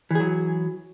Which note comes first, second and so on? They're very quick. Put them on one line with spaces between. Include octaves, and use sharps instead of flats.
E3 G#4 F#3